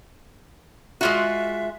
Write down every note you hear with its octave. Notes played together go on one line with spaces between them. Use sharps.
G#3 F4 F#4 E5